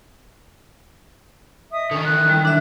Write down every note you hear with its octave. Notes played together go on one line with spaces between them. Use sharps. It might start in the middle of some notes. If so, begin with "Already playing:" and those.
D#5 E5 D#6
D3 D#3 C#4
F#6
G3 E4
D4 E5